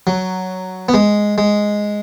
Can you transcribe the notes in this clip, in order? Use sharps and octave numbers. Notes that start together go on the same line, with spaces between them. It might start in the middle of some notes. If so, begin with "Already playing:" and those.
F#3
B3
G#3
G#3